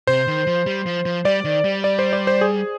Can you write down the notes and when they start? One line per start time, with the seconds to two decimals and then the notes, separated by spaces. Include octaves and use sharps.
0.07 C3 C5
0.27 D#3
0.47 F3
0.66 G3
0.86 F3
1.05 F3
1.25 G3 D5
1.44 D#3
1.64 G3
1.84 D5
1.99 C5
2.13 D5
2.27 C5
2.41 G#4